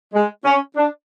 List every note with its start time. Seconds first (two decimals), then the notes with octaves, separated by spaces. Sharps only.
0.14 G#3
0.45 C#4
0.76 D4